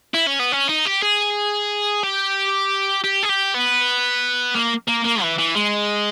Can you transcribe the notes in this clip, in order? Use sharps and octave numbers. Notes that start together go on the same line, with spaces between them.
E4
C#4
B3
C#4
D#4
G4
G#4
G4
G4
G#4
G4
B3
A#3
A#3
A#3
E3
E3
G#3